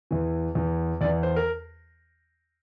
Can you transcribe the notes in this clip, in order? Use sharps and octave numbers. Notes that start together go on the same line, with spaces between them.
E2 E3
E2 E3
E2 E3 D5
C5
A#4